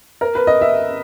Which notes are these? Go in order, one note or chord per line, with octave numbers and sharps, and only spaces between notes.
A#4
B4
D#5
E5